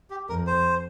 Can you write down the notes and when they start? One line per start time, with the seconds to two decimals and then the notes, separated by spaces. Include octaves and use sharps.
0.10 G4
0.29 F2 A#4
0.47 C5